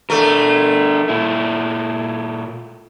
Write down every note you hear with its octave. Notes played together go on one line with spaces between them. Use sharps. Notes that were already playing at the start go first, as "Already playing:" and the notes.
A3 D4 A#4
A#2 E4